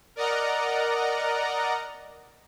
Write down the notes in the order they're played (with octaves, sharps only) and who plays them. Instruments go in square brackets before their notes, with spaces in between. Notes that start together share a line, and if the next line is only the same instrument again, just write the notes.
[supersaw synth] A#4 D5 D#5 F#5 A#5